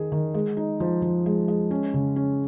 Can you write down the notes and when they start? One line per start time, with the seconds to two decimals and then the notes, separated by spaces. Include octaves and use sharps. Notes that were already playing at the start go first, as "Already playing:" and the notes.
Already playing: D#3 G#4
0.12 D#3
0.34 G#3
0.57 D#4
0.80 F3
1.02 F3
1.26 G#3
1.48 G#3
1.71 C#4
1.94 C#3
2.16 C#4